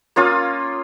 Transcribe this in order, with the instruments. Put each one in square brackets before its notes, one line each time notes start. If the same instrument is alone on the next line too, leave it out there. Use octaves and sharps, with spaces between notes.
[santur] A#3 C#4 F4 D#6